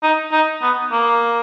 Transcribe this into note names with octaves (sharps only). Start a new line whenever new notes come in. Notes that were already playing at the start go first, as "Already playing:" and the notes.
D#4
D#4
B3
A#3